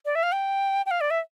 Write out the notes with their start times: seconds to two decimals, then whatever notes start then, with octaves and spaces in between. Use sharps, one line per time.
0.05 D5
0.15 E5
0.23 F5
0.32 G5
0.86 G5
0.91 F5
1.01 D5
1.11 E5